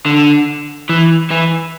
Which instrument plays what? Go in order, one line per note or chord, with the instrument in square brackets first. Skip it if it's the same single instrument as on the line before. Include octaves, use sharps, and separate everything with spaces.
[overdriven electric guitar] D3
E3
E3